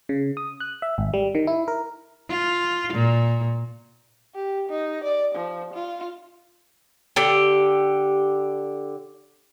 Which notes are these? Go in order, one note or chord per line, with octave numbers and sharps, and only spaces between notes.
C#3
D#6
F#6
E5
G#1
G3
D#3
E4
A#4
F4
A#2
G4
D#4
D5
F3
F4
D3 G4